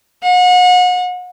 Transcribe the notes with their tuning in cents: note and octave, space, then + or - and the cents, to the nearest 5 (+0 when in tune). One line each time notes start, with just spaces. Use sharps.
F#5 -35